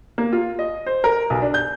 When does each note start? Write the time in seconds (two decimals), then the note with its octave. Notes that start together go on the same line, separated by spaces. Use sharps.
0.18 A#3
0.33 F4
0.59 D#5
0.86 C5
1.04 A#4
1.30 B1
1.42 D4
1.54 G6